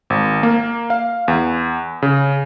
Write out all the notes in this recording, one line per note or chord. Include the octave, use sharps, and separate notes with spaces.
G#1
A#3
F5
E2
C#3